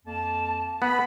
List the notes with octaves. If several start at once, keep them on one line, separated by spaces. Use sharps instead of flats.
F2 A#3 A5
B3 B5